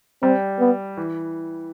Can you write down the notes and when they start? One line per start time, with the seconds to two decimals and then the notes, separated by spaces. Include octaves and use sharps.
0.22 G3 C4
0.60 B3
0.97 E3